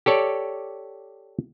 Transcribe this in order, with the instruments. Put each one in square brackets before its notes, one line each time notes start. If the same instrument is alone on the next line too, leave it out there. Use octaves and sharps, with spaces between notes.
[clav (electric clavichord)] G4 A4 C#5 D5